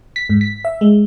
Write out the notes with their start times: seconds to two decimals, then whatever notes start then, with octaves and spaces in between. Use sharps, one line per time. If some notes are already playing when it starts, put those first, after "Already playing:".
0.16 B6
0.29 G#2
0.41 B6
0.65 E5
0.81 G#3